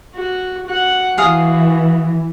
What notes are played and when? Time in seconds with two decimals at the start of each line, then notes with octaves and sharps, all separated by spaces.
0.16 F#4
0.67 F#4 F#5
1.18 E3 F#4 G#4 F5 D#6